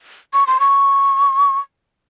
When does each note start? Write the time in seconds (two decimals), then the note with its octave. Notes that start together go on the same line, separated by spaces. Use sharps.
0.33 C#6
0.47 C6
0.60 C#6